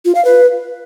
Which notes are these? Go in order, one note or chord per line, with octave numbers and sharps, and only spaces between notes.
F4
F5
B4